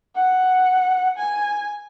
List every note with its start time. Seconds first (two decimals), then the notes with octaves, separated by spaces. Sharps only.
0.15 F#5
1.17 G#5